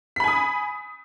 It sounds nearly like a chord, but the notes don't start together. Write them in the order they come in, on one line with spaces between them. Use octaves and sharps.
B6 B5 G#5 D#6